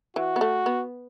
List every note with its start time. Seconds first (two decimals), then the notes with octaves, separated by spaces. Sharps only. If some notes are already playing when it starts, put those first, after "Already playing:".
0.16 E3 F#4
0.36 B3
0.41 A3
0.66 B3